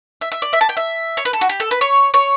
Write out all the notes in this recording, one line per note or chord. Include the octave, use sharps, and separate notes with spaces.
E5
E5
D5
E5
A5
G5
E5
C#5
B4
A4
F#4
G4
A4
B4
C#5
C#5